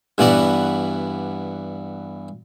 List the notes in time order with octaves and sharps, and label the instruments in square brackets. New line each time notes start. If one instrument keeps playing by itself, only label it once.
[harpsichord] G2 E3 B3 F#4 D5